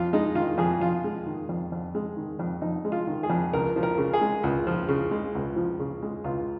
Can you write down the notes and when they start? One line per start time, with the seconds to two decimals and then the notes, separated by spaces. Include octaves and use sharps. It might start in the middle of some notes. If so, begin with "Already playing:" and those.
Already playing: F2 F4
0.13 G#3 D#4
0.35 D#3 F4
0.58 F2 G#4
0.81 F2 F4
1.04 G#3
1.26 D#3
1.49 F2
1.72 F2
1.95 G#3
2.16 D#3
2.39 F2
2.62 F2 D#4
2.85 G#3
2.92 F4
3.07 D#3
3.23 G#4
3.30 F2
3.53 C#2 A#4
3.76 F3
3.83 A#4
3.98 C#3
4.13 G#4
4.21 G#3
4.43 C#2
4.67 F3
4.88 C#3
5.11 G#3
5.35 C#2
5.56 F3
5.79 C#3
6.02 G#3
6.24 C#2 F4